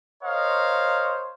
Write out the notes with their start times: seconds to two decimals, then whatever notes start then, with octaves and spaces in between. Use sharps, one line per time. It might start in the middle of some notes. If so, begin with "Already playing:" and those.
0.23 A#4 C5 C#5 D#5 F5